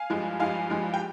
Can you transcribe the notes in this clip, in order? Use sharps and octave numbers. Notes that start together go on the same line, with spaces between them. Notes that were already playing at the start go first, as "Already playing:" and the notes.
Already playing: F5 G#5
G2 F3 G#3
G2 F3 G#3 F5 G#5
G2 F3 G#3
G5